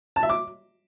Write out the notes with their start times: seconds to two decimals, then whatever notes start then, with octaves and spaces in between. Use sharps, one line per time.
0.16 A5
0.23 E5
0.29 D6